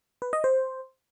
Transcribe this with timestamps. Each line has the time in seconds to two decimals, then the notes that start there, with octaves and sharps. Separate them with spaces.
0.22 B4
0.33 D#5
0.44 C5